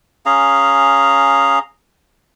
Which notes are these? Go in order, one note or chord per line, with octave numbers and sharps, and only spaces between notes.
C#4 G#4 F5 A#5